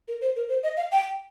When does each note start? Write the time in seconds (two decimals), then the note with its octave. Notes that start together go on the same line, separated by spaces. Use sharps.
0.08 A#4
0.21 C5
0.36 A#4
0.49 C5
0.63 D#5
0.77 F5
0.92 G5